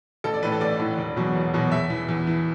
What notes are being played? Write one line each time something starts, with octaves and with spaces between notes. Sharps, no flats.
A1 A4
D5
A2 E3 B4
A4
A1 D5
A2 E3
E1
E2 B2 F#3
E1
E2 B2 F#3
E2 E5
E3
E2
E3